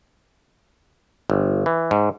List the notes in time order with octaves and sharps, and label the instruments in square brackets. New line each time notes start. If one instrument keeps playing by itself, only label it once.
[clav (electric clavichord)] G1
E3
G#2